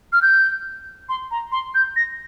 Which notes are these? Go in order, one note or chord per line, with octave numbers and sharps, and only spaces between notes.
F6
G6
C6
A#5
C6
G6
A#6